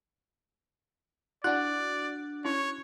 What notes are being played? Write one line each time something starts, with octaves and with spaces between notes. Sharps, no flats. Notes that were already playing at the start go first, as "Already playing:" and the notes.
D4 E4 F#4 D5 F#5 F#6
C#4 E4 C#5